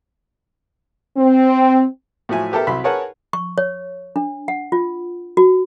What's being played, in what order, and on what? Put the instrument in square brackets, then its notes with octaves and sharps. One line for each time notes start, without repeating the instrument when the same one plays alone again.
[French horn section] C4
[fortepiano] A2 F3 F#3 E5 G#5
B3 G4 A4 A#4 E5
C2 F#3 E5 B5 C6
G#4 A#4 B4 C#5 F#5 A5
[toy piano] C#6
C#5
D4
F#5
F4
F#4